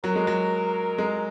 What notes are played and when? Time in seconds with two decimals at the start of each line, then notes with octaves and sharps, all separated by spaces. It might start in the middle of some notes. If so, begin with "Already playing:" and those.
0.04 F#3 A#4
0.15 G#3
0.27 F#3
0.98 G#3